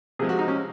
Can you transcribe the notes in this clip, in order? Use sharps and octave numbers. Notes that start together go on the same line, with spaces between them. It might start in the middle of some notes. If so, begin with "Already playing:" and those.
C3 F3 G#3 G#4
F#4
D#4
C#4